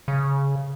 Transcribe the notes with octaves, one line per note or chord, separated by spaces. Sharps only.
C#3